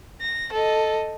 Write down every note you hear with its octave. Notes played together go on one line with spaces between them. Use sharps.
A#6
A4 D#5